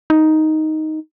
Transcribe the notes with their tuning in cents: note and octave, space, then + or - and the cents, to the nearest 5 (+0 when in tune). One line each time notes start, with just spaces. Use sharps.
D#4 +5